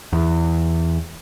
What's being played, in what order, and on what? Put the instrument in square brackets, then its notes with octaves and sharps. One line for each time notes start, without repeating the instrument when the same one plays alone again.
[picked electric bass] E2